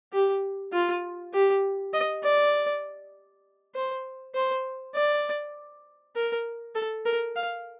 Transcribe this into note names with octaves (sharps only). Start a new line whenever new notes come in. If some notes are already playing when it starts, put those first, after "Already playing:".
G4
F4
G4
D#5
D5
C5
C5
D5
A#4
A4
A#4
F5